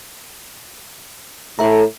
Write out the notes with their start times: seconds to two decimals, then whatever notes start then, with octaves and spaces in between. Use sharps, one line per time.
1.59 A2 A4 E5 A#5